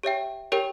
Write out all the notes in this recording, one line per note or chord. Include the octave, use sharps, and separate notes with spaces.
G4 C#5 E5 G5
G4 A#4 C#5 G5